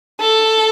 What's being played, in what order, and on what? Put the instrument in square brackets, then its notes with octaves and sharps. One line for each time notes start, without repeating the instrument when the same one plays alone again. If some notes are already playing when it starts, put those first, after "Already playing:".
[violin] A4